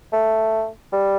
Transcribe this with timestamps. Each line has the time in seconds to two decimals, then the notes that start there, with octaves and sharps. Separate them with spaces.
0.13 A3
0.92 G3